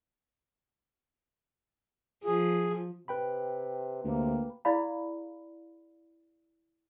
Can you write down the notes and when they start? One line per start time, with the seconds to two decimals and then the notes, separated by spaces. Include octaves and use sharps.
2.24 F3 G#4
3.08 C3 B4 G5 B5
4.04 D2 C3 A#3
4.65 E4 G#4 D5 F5 B5